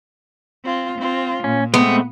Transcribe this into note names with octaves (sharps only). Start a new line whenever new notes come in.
C4 F4
C4 F4
A#2 C#4
G#3 A3 B3 C4